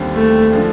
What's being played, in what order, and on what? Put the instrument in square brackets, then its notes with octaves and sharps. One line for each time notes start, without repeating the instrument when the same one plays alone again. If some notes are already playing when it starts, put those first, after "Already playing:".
Already playing: [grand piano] D#2 D3 G3 C4
[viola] A3
[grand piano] D3 F3 G#3